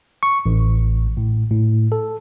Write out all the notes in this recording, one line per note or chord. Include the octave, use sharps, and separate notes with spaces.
C#6
A1
A2
A2
A4